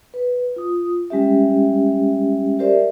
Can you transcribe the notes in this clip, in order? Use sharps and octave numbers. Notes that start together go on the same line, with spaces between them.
B4
F4 D#6
G3 G#3 C#4 G4 E5
G4 A#4 C5 D5 E5